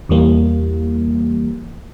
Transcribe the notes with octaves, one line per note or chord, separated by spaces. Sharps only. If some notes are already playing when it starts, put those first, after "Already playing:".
E2 E3 G3 A#3